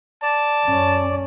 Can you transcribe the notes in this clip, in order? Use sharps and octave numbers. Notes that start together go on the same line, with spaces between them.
D5 A5
F#2 C#4